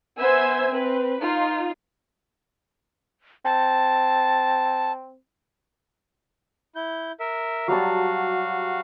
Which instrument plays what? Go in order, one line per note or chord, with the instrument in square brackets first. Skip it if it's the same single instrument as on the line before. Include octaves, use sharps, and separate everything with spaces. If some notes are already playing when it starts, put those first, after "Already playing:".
[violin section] B3 C5 E5 G#5 E6 G#6
C4 B4
D#4 F4
[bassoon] C4 [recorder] A5
[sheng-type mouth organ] E4 G6
A#4 E5
[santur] F#3 G3 A5 [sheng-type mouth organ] F#4 F5